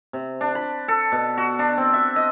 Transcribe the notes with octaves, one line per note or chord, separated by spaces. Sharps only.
C3
D4
B5
A4
B2
F#4
D4
C4
E5
D#5